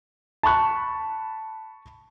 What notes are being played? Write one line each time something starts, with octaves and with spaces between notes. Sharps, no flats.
A5 B5 C#6 F#6